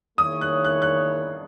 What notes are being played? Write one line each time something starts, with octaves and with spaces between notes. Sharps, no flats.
D#3 A#3 E4 G#4 C#5 D#6
F#6
F#6
F#6